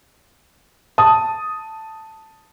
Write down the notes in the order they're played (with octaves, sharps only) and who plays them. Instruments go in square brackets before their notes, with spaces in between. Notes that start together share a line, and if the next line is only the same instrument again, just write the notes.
[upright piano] A5 D#6